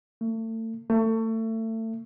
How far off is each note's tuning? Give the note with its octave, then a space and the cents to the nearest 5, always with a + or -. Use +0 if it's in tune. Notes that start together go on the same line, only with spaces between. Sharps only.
A3 +35
A3 +30